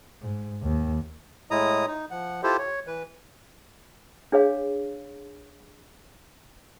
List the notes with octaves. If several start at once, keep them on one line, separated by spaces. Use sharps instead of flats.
G#2
D#2
A2 G#3 E4 A#5 D#6
D#4
F3 F#5
E4 F4 G4 A4 C5
C#5
E3 B4
D4 G#4 C#5 F5